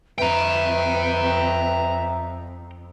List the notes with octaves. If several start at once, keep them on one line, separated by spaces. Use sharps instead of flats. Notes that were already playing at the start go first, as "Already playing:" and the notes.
F2 B4 E5 G5 A#5